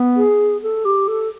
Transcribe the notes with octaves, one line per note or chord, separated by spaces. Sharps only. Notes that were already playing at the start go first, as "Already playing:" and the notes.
Already playing: B3
G#4
A4
G4
A4